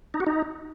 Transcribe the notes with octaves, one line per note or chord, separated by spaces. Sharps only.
D#4
F#4
D#4